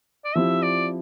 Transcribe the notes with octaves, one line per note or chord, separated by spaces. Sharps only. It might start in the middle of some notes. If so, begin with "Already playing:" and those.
D5
F3 C4 E4 G4 E5
D5